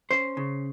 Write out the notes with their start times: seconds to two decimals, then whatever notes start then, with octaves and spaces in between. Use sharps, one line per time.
0.11 C#4 C5
0.37 C#3